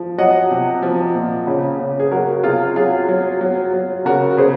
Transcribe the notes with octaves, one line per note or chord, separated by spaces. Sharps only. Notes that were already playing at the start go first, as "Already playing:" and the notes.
Already playing: F3
F#3 D#5 F#5
C3
F3
A#2
C#3
C#3
G#4
F#3 F#4 A#4
C3 F4 G#4
F#3 F4 G#4
F#3
F#3
F#3
C#3 F#4 A#4
C#3 G#4 C5